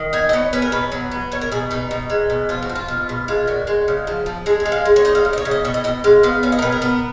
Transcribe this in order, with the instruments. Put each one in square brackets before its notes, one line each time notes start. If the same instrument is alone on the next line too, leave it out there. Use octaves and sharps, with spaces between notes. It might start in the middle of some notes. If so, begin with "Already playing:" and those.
Already playing: [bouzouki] D#3
D#4 G#5
D#5
B3 C#5
C#4 B4
A#4
B2 B4
F#3
B3
B2 C#5
A#4
B2 G#4
B2 D#4
B2
G#3
B2
F3 F4
F#4
F3
F4
B2
B2
G#3 F4
A#2 F#4
G#3
C#3
F3
F3
G#3 G#4
G#4
G#3
F5
G#3
C#5
D#4 D#5
F5
C#3
D#5
C#5
C#3
D#5
B2 C#5
D#5
B2 D#5
G#3 F5
B3 F5
C#4 F5
D#5
A#4
B2 B4
A#4
B3